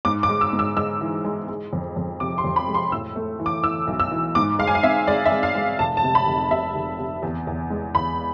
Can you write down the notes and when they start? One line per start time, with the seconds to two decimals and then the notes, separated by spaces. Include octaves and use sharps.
0.05 G#2 D6
0.23 D6
0.29 G#3
0.41 E6
0.53 G#2
0.59 E6
0.77 G#3 E6
1.01 E3
1.25 G#3
1.48 G#3
1.73 F2
1.97 F2
2.20 C3 D6
2.38 C6
2.44 F2
2.56 B5
2.68 G#3
2.74 C6
2.92 A2 E6
3.16 A3
3.39 E3
3.46 D6
3.64 E3 E6
3.87 B1
4.00 E6
4.11 E3
4.35 G#2 D6
4.59 G#3 F5
4.67 G#5
4.75 F5
4.83 C4 E5
5.07 G#3 D5
5.26 E5
5.32 G#3
5.43 F5
5.55 G#3
5.79 F1 A5
5.97 A5
6.03 C3
6.15 B5
6.27 F1
6.51 C3 E5
6.75 F1
6.99 C3
7.22 E2
7.47 E2
7.70 G#3
7.95 E2 B5